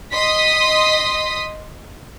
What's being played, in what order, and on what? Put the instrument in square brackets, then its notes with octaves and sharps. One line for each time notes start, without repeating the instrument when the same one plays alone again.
[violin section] D#5 C6 D#6 B6